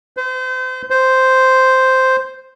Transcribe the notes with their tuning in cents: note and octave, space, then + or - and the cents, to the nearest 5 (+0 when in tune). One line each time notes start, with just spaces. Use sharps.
C5 -35
C5 -5